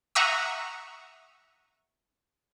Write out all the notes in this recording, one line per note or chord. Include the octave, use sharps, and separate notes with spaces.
E5 F#5 A#5 C#6 D#6